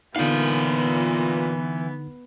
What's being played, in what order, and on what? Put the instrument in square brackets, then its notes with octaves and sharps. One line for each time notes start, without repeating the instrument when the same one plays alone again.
[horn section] A#2 [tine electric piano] D3 D#4 [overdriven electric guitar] E3 F5 [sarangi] B3